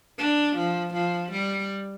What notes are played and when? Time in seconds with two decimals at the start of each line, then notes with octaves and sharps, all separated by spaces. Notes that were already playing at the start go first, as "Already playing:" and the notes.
0.18 D4
0.56 F3
0.94 F3
1.32 G3